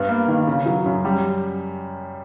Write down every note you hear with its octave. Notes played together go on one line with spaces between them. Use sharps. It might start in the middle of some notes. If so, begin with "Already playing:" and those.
Already playing: G2 B3
A#3
D#3
C#3
F#3
F#2
G3